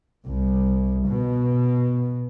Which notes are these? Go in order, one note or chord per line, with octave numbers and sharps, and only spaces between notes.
C2
B2